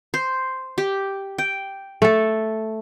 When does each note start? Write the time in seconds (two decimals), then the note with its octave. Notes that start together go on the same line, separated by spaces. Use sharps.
0.14 C5
0.78 G4
1.38 G5
2.02 A3 A4